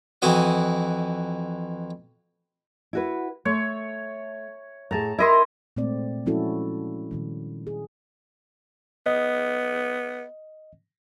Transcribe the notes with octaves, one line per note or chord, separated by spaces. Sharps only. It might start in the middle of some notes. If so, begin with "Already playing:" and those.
F2 E3 F#4 D#5 D#6
E4 F#4 B4
A3 C#5
A2 G#4 A5 A#5
E4 A#4 D#5 E5 C6
A#2 G#3 A3 C4 D5
F3 G#3 C#4 E4 F#4 A4
A#2 D#3 G3
G#4
B3 D#5